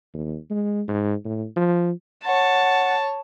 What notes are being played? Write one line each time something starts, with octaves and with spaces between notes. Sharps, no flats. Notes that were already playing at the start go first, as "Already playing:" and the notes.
D#2
G#3
G#2
A2
F3
C#5 F#5 A5